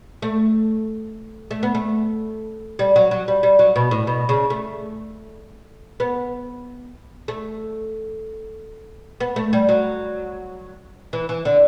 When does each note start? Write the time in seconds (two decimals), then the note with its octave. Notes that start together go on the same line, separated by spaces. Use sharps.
0.22 A3
1.51 A3
1.63 B3
1.75 A3
2.79 G3
2.96 F#3
3.11 F#3
3.28 G3
3.43 G3
3.59 F#3
3.76 B2
3.91 A2
4.07 B2
4.29 C#3
4.50 A3
6.00 B3
7.28 A3
9.20 B3
9.36 A3
9.53 G3
9.69 F#3
11.13 E3
11.29 E3
11.45 D3